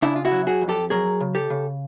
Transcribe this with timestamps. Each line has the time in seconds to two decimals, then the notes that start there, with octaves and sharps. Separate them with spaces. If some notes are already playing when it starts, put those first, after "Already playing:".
0.02 C#3 D4 E4
0.16 F4
0.25 E4 F#4
0.32 F#3
0.47 F#4 G#4
0.62 F2
0.69 G4 A4
0.90 F#3 G#4 A#4
1.20 C#3
1.35 G4 A4
1.50 C#3